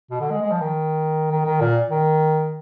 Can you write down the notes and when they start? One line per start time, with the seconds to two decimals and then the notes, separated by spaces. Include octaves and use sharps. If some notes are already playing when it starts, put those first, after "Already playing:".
0.11 B2
0.20 D3
0.31 G#3
0.42 G#3
0.51 F3
0.61 D#3
1.31 D#3
1.46 D#3
1.61 A#2
1.91 D#3